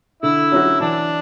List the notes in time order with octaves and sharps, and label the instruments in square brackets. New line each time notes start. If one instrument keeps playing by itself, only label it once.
[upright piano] D3 [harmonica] E4
[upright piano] F#3 C#4 F#4
[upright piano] E3 [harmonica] D4